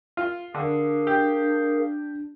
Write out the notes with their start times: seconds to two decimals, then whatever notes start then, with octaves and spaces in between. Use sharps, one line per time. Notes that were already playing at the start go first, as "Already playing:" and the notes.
0.17 F4
0.55 D3 D4 G#4 A#4 F5
1.07 G4